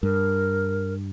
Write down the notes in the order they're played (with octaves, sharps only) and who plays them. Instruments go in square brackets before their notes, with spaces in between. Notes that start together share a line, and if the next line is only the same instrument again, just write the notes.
[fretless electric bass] G2 [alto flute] A#4